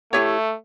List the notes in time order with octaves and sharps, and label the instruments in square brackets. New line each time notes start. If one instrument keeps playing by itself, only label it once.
[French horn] A3 [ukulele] E4 G4 C#5